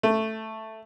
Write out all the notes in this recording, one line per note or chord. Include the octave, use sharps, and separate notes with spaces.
A3